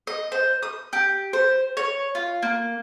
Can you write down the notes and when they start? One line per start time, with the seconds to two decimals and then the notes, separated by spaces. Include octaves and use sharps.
0.07 D#5
0.32 C5
0.63 D#6
0.93 G4
1.33 C5
1.77 C#5
2.15 F4
2.43 A#3